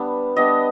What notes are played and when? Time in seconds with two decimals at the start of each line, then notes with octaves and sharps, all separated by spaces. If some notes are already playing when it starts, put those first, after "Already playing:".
Already playing: G3 B3 D4
0.36 G3 B3 D4 D#5